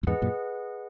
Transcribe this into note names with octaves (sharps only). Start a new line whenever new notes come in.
F#2
E2 G#2 G#4 B4 D#5 F#5
F#2 A#2